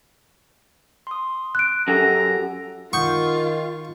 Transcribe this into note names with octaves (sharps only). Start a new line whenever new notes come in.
C6 D#6
F#6 D7
F#2 G4 A4 G#5 A#5
D#3 F4 F#5 C#6 D#6 G6